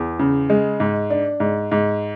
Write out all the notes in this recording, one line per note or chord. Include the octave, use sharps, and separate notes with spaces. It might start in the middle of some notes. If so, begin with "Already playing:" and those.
Already playing: E2
C#3
G#3
G#2
D4
G#2
G#2